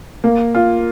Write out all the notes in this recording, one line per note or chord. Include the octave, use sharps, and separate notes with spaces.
A#3
F4